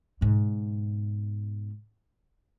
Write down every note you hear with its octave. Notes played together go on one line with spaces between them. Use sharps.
G#2 B2